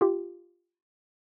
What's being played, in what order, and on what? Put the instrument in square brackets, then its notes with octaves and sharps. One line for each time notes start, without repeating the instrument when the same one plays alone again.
[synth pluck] F4 G4